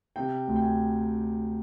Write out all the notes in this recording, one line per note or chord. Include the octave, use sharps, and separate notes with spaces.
C3 G5
D2
G5
G#5